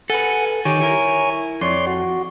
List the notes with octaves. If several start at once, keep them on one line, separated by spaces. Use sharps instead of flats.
A4 B4 F#5 G#5
D#3 G4 C#5 G#5
E4 A#4
F2 C#5 D5 C6
F#4